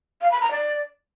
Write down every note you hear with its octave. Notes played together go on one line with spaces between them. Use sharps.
F5
B5
A#5
D5